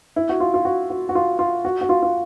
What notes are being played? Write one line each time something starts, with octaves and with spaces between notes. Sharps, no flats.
E4
F#4
F4
F4
F#4
F#4
F#4
F4
F4
F#4
F#4
F4
F4